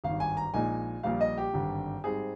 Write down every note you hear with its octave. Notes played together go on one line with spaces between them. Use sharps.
G#1 G2 D#3 F5
G#5
A#5
A#1 A#2 G#3 D#4 G#5
A#1 A#2 G3 F5
D#5
G4
G#1 G2 D3
G#2 G3 C4 G#4